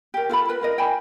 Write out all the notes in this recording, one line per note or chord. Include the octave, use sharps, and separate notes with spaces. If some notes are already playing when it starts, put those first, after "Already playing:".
G4 A#4
F4 A4 F#5 B5
A#4 B4
F4 A#4 D#5
G5 G#5 B5